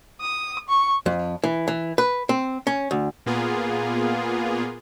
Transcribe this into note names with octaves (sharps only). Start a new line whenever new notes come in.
D#6
C#6
F2
E3
E3
B4
C4
C#4
D2
A#2 A#3 B3 F4 G#4